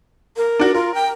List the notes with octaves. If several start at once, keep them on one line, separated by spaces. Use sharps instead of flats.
A#4
D4 F#4
F4 A#4
G5